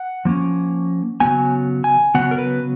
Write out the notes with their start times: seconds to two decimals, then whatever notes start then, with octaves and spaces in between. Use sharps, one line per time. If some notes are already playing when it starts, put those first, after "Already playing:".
Already playing: F#5
0.25 F3 A#3 C#4
1.20 C#3 F#3 B3 G#5
1.84 G#5
2.15 C#3 F#3 B3 F#5
2.31 A#4
2.38 B4